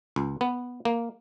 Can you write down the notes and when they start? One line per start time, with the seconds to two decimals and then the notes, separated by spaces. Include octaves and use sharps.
0.16 C#2
0.41 B3
0.85 A#3